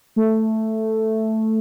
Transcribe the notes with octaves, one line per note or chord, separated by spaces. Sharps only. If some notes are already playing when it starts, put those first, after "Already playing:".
A3